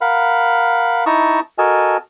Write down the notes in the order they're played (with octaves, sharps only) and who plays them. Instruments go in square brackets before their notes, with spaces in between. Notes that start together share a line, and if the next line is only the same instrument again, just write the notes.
[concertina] A#4 F5 F#5 B5
D#4 E4 A5 A#5 C#6 D#6
F#4 A4 A#4 D#5 G#5 A5